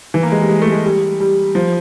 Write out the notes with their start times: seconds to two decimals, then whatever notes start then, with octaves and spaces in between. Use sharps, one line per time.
0.14 E3
0.23 A#3
0.32 G#3
0.41 G3
0.49 G#3
0.62 A3
0.72 G#3
0.85 G3
1.20 G3
1.55 F3